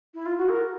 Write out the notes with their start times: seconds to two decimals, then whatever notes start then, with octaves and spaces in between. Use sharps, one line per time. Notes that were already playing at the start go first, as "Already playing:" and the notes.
0.14 E4
0.26 F4
0.38 F#4
0.49 A#4